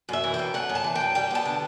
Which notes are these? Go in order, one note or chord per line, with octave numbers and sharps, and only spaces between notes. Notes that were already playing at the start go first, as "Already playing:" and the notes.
F#2 E5
E3
G5
F#2
A3 F#5
F#2
A5
E3
G5
F#2
G3 G5
B3 A5
D3